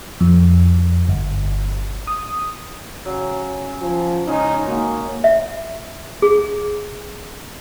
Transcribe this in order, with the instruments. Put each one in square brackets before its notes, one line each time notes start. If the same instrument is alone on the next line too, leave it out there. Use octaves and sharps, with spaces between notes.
[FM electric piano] F2
G1
D#6
[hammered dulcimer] C#3 F#3
[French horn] F3 [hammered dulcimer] G#5 A#5
[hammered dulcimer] C#3 G#3 C#4 [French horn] D#4
[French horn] A#3 [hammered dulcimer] D#4 F#4
[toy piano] E5
G#4